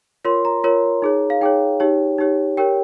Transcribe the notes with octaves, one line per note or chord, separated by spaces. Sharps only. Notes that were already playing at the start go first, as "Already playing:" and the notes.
F4 A#4 C#5 C6
A#5
F4 A#4 C#5
D#4 G#4 C#5
F5
D#4 G#4 C#5 G5
D#4 G4 C#5
D#4 G4 C#5
G4 A#4 C#5 G5